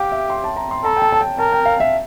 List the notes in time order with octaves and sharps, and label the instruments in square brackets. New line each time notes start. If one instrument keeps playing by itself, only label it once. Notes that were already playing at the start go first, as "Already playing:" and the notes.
Already playing: [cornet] G4 [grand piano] F5 G5
[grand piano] E5
C6
A5
A#5
C6
[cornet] A4 [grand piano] A#5
[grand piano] G5
A5
A5
G5
[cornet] A#4 [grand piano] A5
[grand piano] G5
F5
E5